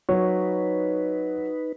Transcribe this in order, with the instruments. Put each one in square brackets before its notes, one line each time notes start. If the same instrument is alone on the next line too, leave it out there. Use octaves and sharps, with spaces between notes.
[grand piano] F#3 [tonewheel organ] D#4 B4 [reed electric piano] C#5